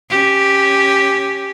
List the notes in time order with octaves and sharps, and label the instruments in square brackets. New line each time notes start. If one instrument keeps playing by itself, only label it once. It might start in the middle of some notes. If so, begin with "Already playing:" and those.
[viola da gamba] C#4 G4